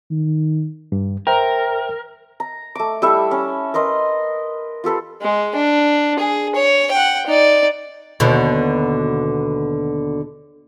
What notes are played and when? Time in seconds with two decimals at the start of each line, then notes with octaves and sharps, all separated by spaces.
0.10 D#3
0.92 G2
1.27 A#4 C5 E5 G5
2.40 A#5
2.75 A3 D6
3.02 G3 E4 A4 E5
3.31 C#4
3.74 A#4 B4 D#5 C6
4.84 F4 G4 A4 B4
5.22 G#3
5.56 D4
6.19 G#4
6.55 C#5
6.91 F#5 G5
7.26 D#4 D5
8.20 D#2 B2 D3